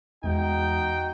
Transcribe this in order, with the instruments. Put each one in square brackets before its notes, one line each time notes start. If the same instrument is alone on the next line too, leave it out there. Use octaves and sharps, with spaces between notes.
[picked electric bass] E2 G#3 [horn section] D#4 F#4 G5